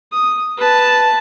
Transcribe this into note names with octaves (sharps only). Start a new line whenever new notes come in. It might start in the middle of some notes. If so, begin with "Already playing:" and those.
D#6
B4 A5